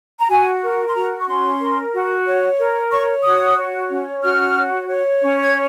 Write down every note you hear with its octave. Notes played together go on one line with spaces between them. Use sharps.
A#5
F#4 G#5
A#4
C6
F#4 A#5
C#6
C#4 C6
A#4
F#4
C#5
A#4
C#5 C#6
F#4 D#6
C#5
C#4
F#4 F6
C#5
C#5
C#4
G#6